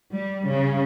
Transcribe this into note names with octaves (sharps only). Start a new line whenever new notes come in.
G3
C#3